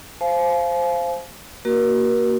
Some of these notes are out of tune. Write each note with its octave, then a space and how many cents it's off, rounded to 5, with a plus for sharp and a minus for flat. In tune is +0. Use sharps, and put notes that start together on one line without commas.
C5 +0 F5 -15 G#5 +45
A#3 +0 F#4 +25 A#4 +30